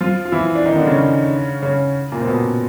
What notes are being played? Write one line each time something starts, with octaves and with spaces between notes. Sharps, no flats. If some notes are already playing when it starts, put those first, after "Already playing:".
F3 F4
F4
E3 E4
D4
D#3 D#4
D3 D4
C#3 C#4
C#3 C#4
A#2 A#3
C4
B2 B3